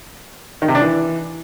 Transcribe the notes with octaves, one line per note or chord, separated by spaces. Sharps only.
D#3
C3
D4
E3